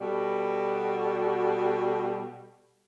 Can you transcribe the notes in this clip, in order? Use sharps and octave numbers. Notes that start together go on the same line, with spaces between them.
B2 G3 F#4 A4